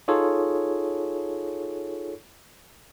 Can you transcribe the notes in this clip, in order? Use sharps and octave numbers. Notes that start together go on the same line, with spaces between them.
D#4 F4 G#4 A4 C#5